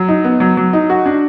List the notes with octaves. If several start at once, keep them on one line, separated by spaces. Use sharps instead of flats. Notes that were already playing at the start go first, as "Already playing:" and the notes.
Already playing: F#3
D#4
B3
F#3
F#3
D#4
F#4
D4